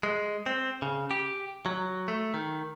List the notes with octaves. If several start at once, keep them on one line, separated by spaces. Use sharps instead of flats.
G#3
C4
C#3
G4
F#3
A3
D#3